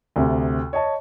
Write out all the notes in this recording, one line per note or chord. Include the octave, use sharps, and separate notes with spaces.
D2 C3
C#5 D#5 A5